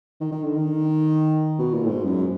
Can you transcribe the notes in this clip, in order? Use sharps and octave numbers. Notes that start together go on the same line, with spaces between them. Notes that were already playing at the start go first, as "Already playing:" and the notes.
D#3
D#3
D3
D#3
B2
A#2
A2
G#2
F#2